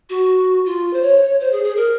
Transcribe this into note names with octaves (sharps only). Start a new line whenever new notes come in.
F#4
F4
C5
C#5
C5
G#4
G#4
A#4